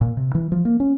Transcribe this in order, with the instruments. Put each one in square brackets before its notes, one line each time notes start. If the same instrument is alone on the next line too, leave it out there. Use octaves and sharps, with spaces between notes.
[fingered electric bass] A#2
C3
E3
F3
A#3
C#4